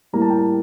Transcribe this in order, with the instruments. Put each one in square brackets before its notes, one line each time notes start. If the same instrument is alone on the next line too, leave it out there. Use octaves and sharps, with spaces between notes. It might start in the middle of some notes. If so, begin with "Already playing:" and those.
[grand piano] A2 G3 A#3 A#5
A5
G5
A5